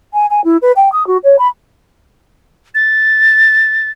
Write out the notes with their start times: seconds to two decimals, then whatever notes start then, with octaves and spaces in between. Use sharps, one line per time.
0.14 G#5
0.30 G#5
0.45 E4
0.62 B4
0.76 G5
0.92 D#6
1.07 F#4
1.24 C#5
1.39 B5
2.75 A6